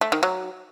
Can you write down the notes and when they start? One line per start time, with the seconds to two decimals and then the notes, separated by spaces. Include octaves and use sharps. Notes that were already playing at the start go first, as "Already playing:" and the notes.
0.01 A3
0.12 D#3
0.23 F#3